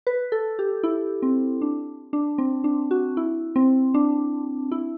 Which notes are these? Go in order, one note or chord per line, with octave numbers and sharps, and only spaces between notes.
B4
A4
G4
E4
C4
D4
D4
C4
D4
F#4
E4
C4
D4
E4